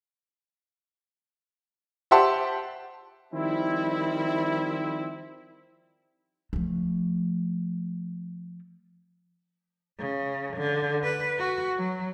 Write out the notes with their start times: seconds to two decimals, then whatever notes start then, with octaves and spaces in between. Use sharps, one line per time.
2.11 G4 C5 E5 F#5 A5 C6
3.33 D#3 F3 G3 C4 E4
6.53 F3 A3
9.99 C#3
10.57 D3
11.04 B4
11.38 F#4
11.78 F#3